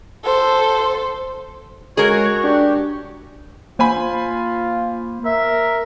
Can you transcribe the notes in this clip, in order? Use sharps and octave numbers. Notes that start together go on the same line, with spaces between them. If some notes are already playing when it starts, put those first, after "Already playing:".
A4 C5
G#3 F#4 G#4 A#4 C#5 C#6
D4 G4
A#3 F4 C5 G#5 B5
A#4 E5